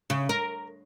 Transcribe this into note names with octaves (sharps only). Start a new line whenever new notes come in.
C#3
A#4